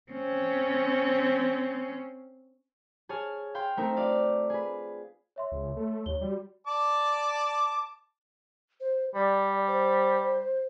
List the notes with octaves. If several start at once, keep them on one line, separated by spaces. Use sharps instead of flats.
C4 C#4
G#4 C#5 G#5 A5 F6
F5 G5 C6
A3 C4 D#4 A#4
F4 D5 F5
G#4 B4
C#5 E5 C6
C#2
A3
D#2 C#5 G7
G3 F#4 D5
D5 A5 D6
C5
G3 D5
C5